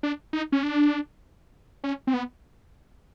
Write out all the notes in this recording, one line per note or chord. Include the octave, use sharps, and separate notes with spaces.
D4
D#4
C#4
D4
C#4
C4
B3